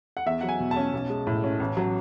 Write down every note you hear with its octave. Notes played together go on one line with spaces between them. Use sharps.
F#5
E2 E5
F#3 F#5
G#5
B2
A5
C#4
B1
G#3
A2
C#4
A1
F#3